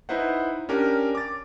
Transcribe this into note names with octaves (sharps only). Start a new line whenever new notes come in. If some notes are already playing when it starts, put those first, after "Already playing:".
D#4 E4 B4 C5 F#5
C#4 D4 G4 A#4
D6 A6